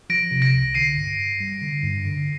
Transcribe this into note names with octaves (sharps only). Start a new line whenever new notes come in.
F3 A#6 D7
C3
A#6 D7
C2
D3 C7 D#7
G2
G2
G3
D3
G2
D3